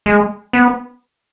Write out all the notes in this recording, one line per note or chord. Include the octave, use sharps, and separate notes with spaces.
G#3
B3